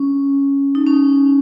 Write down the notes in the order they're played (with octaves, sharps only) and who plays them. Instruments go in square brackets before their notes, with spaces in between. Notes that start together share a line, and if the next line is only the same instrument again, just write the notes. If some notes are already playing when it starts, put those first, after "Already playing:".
Already playing: [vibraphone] C#4
D#4
C#4